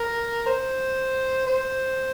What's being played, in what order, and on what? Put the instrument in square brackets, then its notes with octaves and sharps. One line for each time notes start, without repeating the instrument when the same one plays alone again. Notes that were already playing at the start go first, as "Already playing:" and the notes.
Already playing: [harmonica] A#4
C5
C5